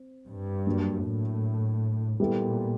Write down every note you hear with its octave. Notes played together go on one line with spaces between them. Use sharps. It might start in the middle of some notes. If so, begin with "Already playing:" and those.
Already playing: C4
G2
F#3 A#3 D4
A2
A#2 G3 B3 E4 A4